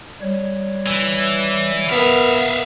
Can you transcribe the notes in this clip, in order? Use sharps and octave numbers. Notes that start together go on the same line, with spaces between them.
G3 C#5
E3
B3 A#4 E5 F5